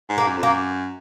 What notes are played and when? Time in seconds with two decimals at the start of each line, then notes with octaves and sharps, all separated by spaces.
0.10 G#2
0.18 A#3
0.27 F#2
0.38 F2
0.43 F#2 A#3